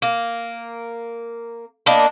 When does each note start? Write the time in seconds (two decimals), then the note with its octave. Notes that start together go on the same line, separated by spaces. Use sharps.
0.02 A#3
1.86 A#3 B3 D4 D#4